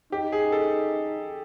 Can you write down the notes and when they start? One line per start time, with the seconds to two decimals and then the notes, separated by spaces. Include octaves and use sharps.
0.12 D#4 G4
0.32 G#4
0.52 A4